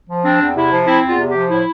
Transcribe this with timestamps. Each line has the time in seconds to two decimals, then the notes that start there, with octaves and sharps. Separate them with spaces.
0.08 F3
0.24 C4 D4
0.40 E2
0.56 C3 E4
0.71 F3
0.87 C4 E4
1.03 E2
1.08 F4
1.19 C3
1.30 G4
1.35 F3
1.50 A2 E4